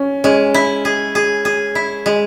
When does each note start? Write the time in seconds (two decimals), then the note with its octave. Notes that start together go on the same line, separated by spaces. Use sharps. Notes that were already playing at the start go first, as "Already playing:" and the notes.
Already playing: C#4
0.24 G#3 C#4
0.54 E4
0.85 G#4
1.15 G#4
1.45 G#4
1.75 E4
2.06 G#3